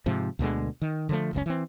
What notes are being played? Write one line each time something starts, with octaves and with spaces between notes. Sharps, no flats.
G#2 C3 F3
D2 B2 D3 G#3
D#3
D3 F3 A3
F#1 C#2 A#2 C#4
E3 C4